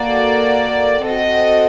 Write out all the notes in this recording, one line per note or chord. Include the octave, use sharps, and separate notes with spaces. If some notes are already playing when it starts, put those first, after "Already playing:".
Already playing: A#3 F#4 A4 D5
C4 F#4 A4 D#5